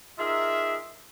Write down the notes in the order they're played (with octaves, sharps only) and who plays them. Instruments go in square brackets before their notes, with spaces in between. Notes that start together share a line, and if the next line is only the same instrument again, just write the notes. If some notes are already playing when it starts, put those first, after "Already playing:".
[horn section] D#4 F4 G#4 A#4 E5